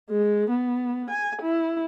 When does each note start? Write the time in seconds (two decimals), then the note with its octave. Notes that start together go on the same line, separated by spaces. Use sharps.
0.10 G#3
0.50 B3
1.10 G#5
1.42 E4